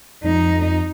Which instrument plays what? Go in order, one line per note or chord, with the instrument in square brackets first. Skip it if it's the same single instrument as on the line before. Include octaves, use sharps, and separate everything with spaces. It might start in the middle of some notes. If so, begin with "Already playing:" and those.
[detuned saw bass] F2 [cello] D#4